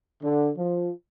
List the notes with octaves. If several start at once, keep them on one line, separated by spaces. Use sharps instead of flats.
D3
F3